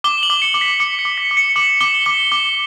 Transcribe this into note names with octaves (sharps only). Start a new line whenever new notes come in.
D6 G7
F#7
D6
C#7
D6
B6
D6 C#7
C#7
D6
B6
D6
C#7
D6 F#7
D6 G7
D6 G7
D6